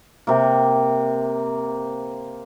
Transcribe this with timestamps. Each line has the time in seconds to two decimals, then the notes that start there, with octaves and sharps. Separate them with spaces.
0.27 C3 A#3